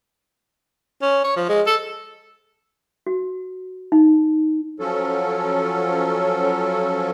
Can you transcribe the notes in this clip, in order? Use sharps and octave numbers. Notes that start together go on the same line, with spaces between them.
C#4
C#5
F3
G#3
A4
F#4
D#4
F3 F#3 C#4 A4